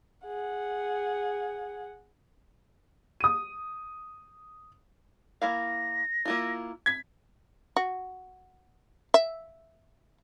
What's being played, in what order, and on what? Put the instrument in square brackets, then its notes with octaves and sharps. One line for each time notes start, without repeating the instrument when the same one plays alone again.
[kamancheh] G#4 F#5
[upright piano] D#6 D#7
[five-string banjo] A#3 E4 F5 [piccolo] A#6
[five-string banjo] A#3 E4 F4
[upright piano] G#6 B6
[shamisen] F#4
E5